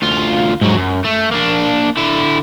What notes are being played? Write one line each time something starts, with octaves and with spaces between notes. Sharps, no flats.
D2 F4
G#2 F#3
F#2
A3
A#3 D4
D3 E4